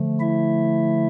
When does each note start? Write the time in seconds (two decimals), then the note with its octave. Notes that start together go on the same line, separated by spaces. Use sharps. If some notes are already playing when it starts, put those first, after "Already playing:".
Already playing: D3 F3 A3
0.20 E4 E5